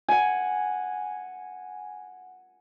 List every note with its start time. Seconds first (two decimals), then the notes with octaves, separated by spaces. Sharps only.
0.08 F#5 G#5